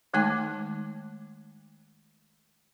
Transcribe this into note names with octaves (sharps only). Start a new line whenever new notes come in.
D#3 G#3 A3 D#4 A5 D6